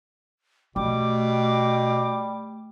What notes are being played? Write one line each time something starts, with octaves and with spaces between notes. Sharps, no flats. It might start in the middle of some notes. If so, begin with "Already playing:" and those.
B2 G3 A3 D6